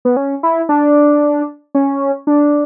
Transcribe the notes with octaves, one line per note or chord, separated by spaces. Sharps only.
B3
C#4
E4
D4
C#4
D4